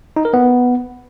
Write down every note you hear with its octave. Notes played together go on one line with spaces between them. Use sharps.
D#4
A#4
B3